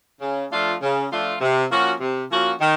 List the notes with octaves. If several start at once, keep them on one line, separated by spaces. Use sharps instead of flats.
C#3
F3 A3 D4 F4
C#3
F3 A3 D4 F4
C3
F3 A#3 C#4 F#4
C3
F3 A#3 C#4 F#4
D#3